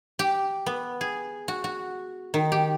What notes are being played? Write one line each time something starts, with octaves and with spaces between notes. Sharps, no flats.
G4
B3
G#4
F#4
F#4
D#3
G4